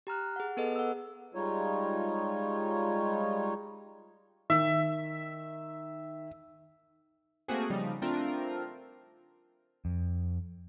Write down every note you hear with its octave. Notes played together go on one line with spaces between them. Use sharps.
G4 A#5 F6 F#6
G#4 F#5
B3 G#4 A4 B4 D#5
F#5 E6
G3 G#3 D#4 F4 C#5
D#3 E5
A3 A#3 C4 F#4 G#4
C#3 F3 G3 D#4
A3 C4 D4 F4 A#4
F2